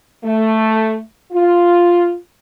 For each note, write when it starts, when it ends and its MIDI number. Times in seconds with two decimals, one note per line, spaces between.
0.24 0.99 57
1.32 2.15 65